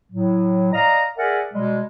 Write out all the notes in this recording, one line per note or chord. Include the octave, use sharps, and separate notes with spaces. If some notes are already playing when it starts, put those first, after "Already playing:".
A2 F#3
D5 D#5 F5 A#5
G#4 A#4 D5 E5 F#5 G#5
B2 G3 G#3